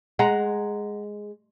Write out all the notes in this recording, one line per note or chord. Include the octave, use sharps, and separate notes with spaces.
G#3 F#5 A#5